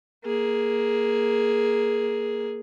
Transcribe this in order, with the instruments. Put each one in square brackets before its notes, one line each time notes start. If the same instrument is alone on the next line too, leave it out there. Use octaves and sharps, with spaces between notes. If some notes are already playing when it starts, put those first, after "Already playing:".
[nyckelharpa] A#3 G#4